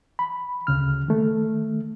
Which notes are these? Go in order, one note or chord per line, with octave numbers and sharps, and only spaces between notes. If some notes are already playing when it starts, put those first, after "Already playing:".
B5
D2 C#3 F6
D#3 A3